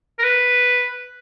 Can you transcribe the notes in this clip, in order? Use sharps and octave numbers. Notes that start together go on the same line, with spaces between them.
A#4
B4